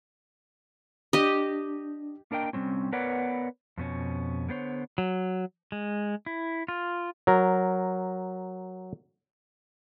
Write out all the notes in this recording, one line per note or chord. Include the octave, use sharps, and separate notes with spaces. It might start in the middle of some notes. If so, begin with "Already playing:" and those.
D4 G4 D#5
A#3 D4 A#4 D#5 G5
C3 E3 G3 C4 C#4
B3 A#4 B4 C#5 D5 F#5
F2 B2 C#4
D3 B3 C5 C#5
F#3
G#3
E4
F4
F#3 A#4